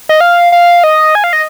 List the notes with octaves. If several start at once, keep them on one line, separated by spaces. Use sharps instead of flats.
D#5
F5
F5
D#5
G#5
F5
D#5